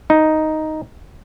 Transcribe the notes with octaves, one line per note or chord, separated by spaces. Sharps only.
D#4